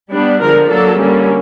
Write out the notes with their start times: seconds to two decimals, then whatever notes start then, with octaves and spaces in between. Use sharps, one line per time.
0.11 G3 B3 D4
0.40 D3 F3 G#3 A#4
0.68 F#3 A#3 D4 A4
0.97 D3 G3 A#3 C#4